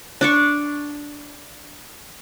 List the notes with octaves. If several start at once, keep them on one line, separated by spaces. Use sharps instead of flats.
D4 D5 C#6